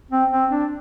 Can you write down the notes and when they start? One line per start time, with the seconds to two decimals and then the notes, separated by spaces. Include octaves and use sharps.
0.11 C4
0.32 C4
0.51 D4